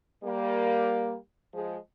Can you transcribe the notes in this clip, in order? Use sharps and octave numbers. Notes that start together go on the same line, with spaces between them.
G3 A#3
F3 G#3